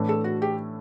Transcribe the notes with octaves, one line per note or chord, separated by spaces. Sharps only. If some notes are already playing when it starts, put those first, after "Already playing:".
Already playing: A2 E3 A3 D4
A4
F#4
G4